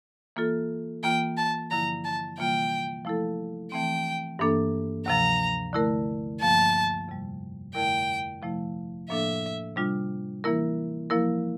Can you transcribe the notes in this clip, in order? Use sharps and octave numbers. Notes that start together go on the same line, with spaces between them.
E3 A#3 F4 A4
E3 A#3 F4 G5
A5
G2 D3 F3 A#3 E4 A#5
A5
C3 E3 G3 A#3 F4 G5
F3 A3 E4 A4
E3 A3 C4 G5
G2 E3 A#3 D4 A4
D2 C3 F3 A#5
D3 A3 E4 A#4
G2 F3 A#3 A5
F2 C3 G3
F2 D3 A3 E4 A#4 G5
C3 F3 A3 E4
A2 F3 A#3 D4 A4 E5
C3 G3 D4 F4
E3 A#3 E4 A#4
F3 A#3 E4 A#4